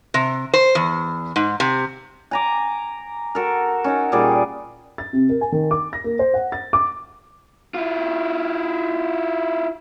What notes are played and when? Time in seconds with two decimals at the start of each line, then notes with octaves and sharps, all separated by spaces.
0.14 C3
0.54 C5
0.75 E2
1.36 G#2
1.60 C3
2.31 G#5 A#5 D6
3.35 F#4 A4 A#4
3.84 C#4 D#4 F#5
4.12 A#2 G3 G#4 D5
4.98 A6
5.13 C3
5.29 A#4
5.41 G#5
5.52 D#3
5.71 D6
5.93 A#6
6.04 A#3
6.19 C5
6.34 F#5
6.52 A6
6.73 D6
7.74 E4 F4